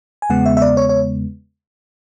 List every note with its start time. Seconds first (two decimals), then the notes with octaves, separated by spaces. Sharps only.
0.22 G#5
0.29 E2 C#3 G#3 B3 F#5
0.46 E5
0.57 E5
0.62 D5
0.77 C#5
0.89 C#5